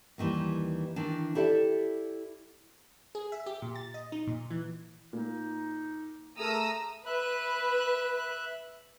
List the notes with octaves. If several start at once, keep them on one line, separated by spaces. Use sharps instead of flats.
D#2 D#3 E3 G3
D#3 E3 D4
E4 G4 A4 D5 E5
G#4
E5
G4
A#2
A6
D#5
D#4
A#2
E3
A#2 D#4
A3 G#4 A#4 A#5 D#6 E6
B4 E5 F#6